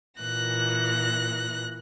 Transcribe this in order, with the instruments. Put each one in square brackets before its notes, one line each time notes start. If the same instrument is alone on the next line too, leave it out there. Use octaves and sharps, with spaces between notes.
[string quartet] A#2 E3 F#6 A#6